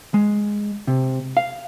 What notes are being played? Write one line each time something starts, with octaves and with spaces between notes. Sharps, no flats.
G#3
C3
F5